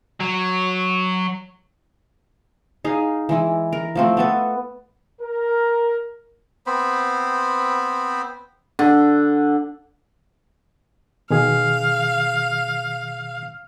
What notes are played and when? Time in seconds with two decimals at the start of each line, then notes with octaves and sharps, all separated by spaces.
0.20 F#3
2.84 D#4 G#4 F5
3.29 E3 G#3 E4
3.72 A#4
3.95 F3 A3 C4
4.17 B3 A4 B4
5.21 A#4
6.66 B3 C4 C5 B5
8.79 D3
11.30 B2 D#3 G#4 F5